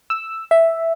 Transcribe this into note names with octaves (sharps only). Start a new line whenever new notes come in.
E6
E5